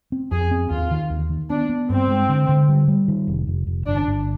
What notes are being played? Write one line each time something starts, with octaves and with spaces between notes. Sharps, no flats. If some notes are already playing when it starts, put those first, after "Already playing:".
C4
F2 G#4
C4
D#2 F4
D#3
D#2
D#3
B3 D4
B3
G2 C4
G#3
D3
D3
G3
G3
D#3
F1
F1
F1
G1 D4
G1